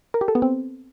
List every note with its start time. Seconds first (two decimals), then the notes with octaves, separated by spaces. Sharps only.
0.14 A#4
0.21 G4
0.28 A4
0.35 B3
0.42 C4